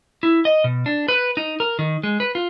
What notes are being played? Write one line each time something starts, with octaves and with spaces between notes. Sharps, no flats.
E4
D#5
B2
D4
B4
D#4
A#4
D#3
G#3
B4
F4